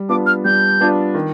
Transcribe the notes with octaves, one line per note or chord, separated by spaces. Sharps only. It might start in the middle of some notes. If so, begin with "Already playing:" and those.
Already playing: G3
B3 D4 F4 D6
F6
G3 G6
B3 D4 F4
D#3